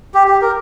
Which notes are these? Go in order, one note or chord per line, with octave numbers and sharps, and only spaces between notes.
G4
G4
A#4